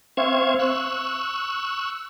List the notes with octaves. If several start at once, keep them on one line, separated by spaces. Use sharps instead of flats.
C4 C5 E5 F5 C#6 G#6
C#6 E6 F#6